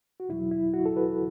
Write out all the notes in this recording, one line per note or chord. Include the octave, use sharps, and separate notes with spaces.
F#4
E2 B2 F#3 E4
E4
F#4
A4
B4